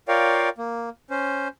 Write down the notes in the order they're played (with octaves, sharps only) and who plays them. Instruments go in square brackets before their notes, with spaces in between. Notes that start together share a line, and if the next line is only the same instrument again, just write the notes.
[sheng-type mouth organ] F4 A#4 C#5 D5 F5 G5
A#3
C#4 C5